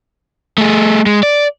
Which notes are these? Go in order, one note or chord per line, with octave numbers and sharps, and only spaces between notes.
A3 G#4
G#3
D5